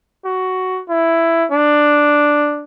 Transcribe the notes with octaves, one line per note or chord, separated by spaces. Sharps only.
F#4
E4
D4